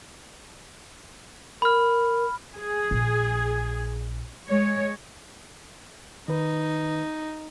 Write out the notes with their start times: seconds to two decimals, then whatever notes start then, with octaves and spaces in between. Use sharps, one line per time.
1.62 A#4 B5 F6
2.54 G#4
2.91 A#1
4.49 G#3 C#5
6.28 D#3 D#4 B4